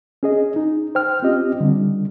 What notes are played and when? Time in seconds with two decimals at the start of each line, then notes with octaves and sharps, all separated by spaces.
0.23 C#4 G#4 D#5
0.56 D#4
0.95 C5 G5 F6
1.23 C4 C#4 F4 G4 D#5
1.60 D3 G3